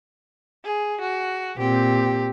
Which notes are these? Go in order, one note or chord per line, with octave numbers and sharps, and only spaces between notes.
G#4
F#4
A#2 C4 G4